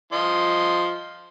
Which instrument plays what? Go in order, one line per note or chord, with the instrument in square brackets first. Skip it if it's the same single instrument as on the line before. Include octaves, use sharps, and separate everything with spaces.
[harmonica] F3 D#5 C6